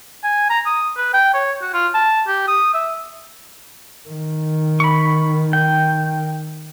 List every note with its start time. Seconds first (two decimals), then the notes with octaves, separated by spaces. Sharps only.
0.24 G#5
0.50 A#5
0.66 D#6
0.97 B4
1.14 G5
1.34 C#5
1.62 F#4
1.74 F4
1.94 A5
2.28 G4
2.48 D#6
2.74 E5
4.09 D#3
4.80 B5 C#6
5.53 G5